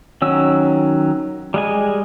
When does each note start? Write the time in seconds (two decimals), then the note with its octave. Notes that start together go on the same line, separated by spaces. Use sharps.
0.22 D#3 F#3 C#4 E6
1.54 G3 G#3 G#5